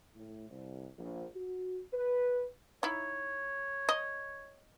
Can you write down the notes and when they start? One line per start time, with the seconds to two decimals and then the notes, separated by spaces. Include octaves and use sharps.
0.15 A2
0.50 C2
0.97 A#1
1.34 F#4
1.92 B4
2.83 D#4 E4 C#5
3.89 D#5